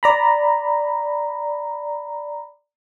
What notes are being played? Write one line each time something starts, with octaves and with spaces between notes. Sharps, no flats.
D5 A#5 B5